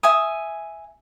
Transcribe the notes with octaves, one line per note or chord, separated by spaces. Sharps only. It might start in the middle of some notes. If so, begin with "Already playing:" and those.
E5 G#5 D#6